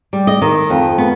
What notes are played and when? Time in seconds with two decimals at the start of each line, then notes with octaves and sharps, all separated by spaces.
0.13 G3
0.27 D#5
0.42 D#3
0.70 F2
0.98 B3